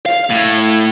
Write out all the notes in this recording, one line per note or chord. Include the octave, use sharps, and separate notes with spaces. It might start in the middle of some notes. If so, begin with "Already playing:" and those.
F5
A2